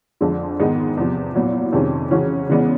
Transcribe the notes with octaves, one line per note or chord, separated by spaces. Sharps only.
F2 D3 F3 G#3
G#2 D#3 G#3 B3 D#4
E2 C3 F3
A#2 F#3 B3 E4
F2 C3 D#3 G#3 C#4
C#3 E3 G#3 C#4 F#4
C#3 E3 G#3 B3 D4